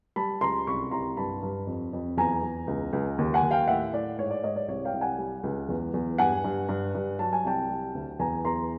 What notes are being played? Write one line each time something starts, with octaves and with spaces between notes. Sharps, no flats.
G3 A5 B5
C#2 A#5 C6
C2 B5 C#6
C2 A#5 C6
G2 A5 B5
G2
F2
F2
E2 G#5 A#5
E2
C#2
C#2
D#2
F#5 G#5
D#2
F5 G5
A2 E5 F#5
A2 D5
G#2 C#5
D5
G#2 C#5 D#5
D5
C2 C#5
F5 G5
C2
F#5 G#5
G3
C#2
E2
E2
G2 F#5 G#5
G2
G2
G2
F#3 A5
G#5
C2 G5 A5
G3
D2
E2 G#5 A#5
E2 A#5 C6